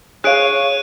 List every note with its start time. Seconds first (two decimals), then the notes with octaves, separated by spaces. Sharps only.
0.24 G#4 C#5 F5 F#6 D7 D#7